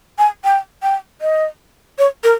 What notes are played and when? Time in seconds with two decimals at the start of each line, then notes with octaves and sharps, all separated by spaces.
0.19 G#5
0.44 G5
0.83 G5
1.21 D#5
1.99 C#5
2.24 A#4